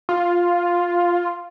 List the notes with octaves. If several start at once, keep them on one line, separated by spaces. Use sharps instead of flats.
F4